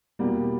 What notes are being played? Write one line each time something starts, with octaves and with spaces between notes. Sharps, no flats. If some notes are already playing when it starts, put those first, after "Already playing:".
E2 B2 G3 A#3